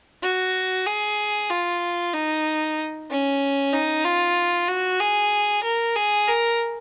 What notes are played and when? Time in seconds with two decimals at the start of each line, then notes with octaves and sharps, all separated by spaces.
0.23 F#4
0.86 G#4
1.50 F4
2.14 D#4
3.09 C#4
3.73 D#4
4.05 F4
4.68 F#4
5.00 G#4
5.63 A#4
5.95 G#4
6.28 A#4